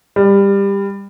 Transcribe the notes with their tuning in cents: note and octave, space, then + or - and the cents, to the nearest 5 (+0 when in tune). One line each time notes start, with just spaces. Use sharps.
G3 +20